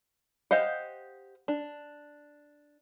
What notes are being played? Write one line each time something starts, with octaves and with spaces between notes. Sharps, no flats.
G4 C5 D#5 F5 F#5
D4